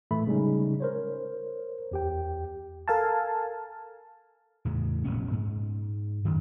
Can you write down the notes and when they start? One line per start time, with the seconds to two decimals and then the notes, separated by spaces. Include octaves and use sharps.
0.11 A2 E3 A3 B5
0.27 C#3 G3 G#3 C#4 D#4
0.80 A#4 C5 C#5
1.91 E2 G4 G5
2.88 A4 A#4 F5 G#5 A5
4.65 E2 A2 C#3
5.04 F1 A#2 B3 C#4
5.31 G#2
6.25 F#2 D#3